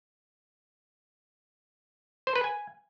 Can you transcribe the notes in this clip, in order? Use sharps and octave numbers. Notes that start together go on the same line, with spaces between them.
C5
B4
G#5